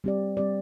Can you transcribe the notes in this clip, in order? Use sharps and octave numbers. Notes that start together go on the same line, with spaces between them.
G3 C4 G4 D5
G3 C4 G4 D5